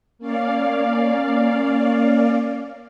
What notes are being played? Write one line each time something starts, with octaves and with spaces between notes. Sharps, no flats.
A#3 C#4 D5 F5